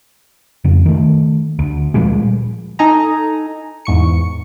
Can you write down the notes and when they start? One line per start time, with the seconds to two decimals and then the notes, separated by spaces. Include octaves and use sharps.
0.64 F2 C#3
0.86 D#3 A3
1.59 D2
1.94 A#2 F3 G3 G#3
2.79 D#4 A4 D#5 G#5 A#5
3.85 E2 G#2 C#6 C#7